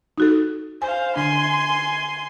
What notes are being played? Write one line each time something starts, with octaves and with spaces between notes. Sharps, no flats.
D#4 F#4 A4
C5 F5 G#5
D3 D4 G#5 C6